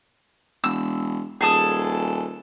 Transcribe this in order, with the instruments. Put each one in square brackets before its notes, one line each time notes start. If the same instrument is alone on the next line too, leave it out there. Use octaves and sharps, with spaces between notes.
[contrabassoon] E1 [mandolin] E6
[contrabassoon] D#1 [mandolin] G#4 A4 D#6